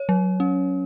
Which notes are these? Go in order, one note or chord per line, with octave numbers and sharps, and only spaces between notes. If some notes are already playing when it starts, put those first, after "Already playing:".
Already playing: C#5
F#3
C#4